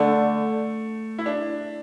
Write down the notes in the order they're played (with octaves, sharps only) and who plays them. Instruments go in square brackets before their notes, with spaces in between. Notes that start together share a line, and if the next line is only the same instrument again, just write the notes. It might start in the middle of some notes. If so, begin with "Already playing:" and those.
Already playing: [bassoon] D3 [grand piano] A3
[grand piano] E4
D4